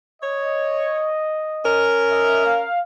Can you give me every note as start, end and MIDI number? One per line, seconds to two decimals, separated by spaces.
0.22 1.10 73
0.22 1.87 75
1.64 2.65 61
1.64 2.65 70
2.10 2.43 75
2.10 2.43 76
2.45 2.79 77